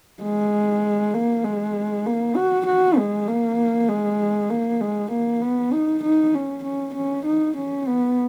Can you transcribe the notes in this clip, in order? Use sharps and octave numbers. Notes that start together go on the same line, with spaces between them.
G#3
A#3
G#3
A#3
F#4
F#4
G#3
A#3
G#3
A#3
G#3
A#3
B3
D#4
D#4
C#4
C#4
C#4
D#4
C#4
B3